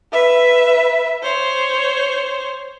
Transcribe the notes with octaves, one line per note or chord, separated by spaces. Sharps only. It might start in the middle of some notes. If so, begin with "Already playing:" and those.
B4 E5
C5 C#5